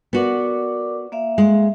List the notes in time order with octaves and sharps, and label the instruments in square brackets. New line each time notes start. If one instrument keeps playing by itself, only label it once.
[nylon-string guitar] B3 F#4 [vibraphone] A#4 D5 D6
[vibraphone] A#3 E5 F5
[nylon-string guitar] G#3